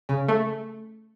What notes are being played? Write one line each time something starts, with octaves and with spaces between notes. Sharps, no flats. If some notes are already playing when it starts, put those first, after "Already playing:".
C#3
A3